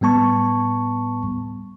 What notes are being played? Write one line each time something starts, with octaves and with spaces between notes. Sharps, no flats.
A2 G3 B3 A5 C#6